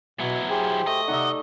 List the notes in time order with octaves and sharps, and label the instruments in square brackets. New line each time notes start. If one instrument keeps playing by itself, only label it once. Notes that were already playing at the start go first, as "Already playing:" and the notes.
[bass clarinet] B2 [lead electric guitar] F#3 E4 [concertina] B3
[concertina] G4 C5 [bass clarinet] G#4
[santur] A3 [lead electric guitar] D#5
[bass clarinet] C3 [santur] D#4 D5 E5 [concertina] F#5